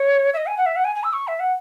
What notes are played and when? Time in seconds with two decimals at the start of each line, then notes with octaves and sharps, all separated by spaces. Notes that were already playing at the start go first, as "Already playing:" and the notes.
Already playing: C#5
0.33 E5
0.37 D#5
0.46 G#5
0.57 F#5
0.66 E5
0.76 F#5
0.84 G#5
0.95 G#5
1.03 E6
1.13 C#6
1.27 E5
1.39 F#5